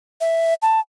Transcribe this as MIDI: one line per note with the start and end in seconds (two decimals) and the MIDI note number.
0.21 0.54 76
0.62 0.80 81